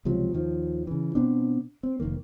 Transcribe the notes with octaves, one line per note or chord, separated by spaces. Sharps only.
C#2 C3 F3 F#3
D#2 D#3 F3
C#3 E3
B2 B3 C4 D4
C4
F1 F2 D#3 A#3